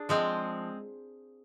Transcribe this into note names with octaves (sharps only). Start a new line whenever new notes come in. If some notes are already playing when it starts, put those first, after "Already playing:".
Already playing: D4 G#4
F3 G#3 C4